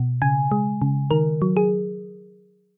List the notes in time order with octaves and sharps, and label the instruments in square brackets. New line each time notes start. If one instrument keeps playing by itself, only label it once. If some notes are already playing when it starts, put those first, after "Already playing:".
Already playing: [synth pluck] B2
C#3 G#5
G#3
C#3
D#3 A#4
F#3
G#4